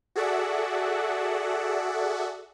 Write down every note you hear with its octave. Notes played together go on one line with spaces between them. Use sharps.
F#4 G#4 A4 D5 E5 F#5